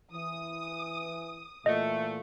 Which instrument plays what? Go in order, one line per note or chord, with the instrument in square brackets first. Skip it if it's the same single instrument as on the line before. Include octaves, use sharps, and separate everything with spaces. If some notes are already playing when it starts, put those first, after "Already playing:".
[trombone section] E3 [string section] D#6
[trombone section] A#2 E3 F4 [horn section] A3 [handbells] D#5